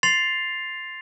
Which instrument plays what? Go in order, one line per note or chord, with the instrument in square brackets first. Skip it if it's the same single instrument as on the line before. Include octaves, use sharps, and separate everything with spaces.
[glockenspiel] C6 A6 C7 F7